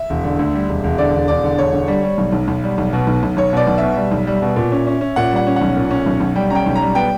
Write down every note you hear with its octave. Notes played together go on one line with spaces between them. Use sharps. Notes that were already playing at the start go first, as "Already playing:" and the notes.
Already playing: E5
E1
D3
D2
G3
E1
E1
D3 D5
E1
E1 D5
D3
E1 C#5
D3
G3
G3
B1
B1
B1
G3
B1
B2
B1
B1
B1 C#5
B2 D5
B1
B2 E5
G3
B1
G3
B2
A#2
C#4
C#4
C#4
A#2 F#5
G3 F#5
C#4
F#5
B1
A#2
C#4
B1
B1
G3 G5
C#4 G5 A#5
B1
A#5
G3
B3 G5